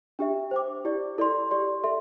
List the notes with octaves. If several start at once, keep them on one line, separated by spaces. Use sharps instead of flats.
D4 G4 E5
C5 G5 D6
E4 G4 D5
E4 A4 D5 C6
G4 D5 C6
A4 E5 C6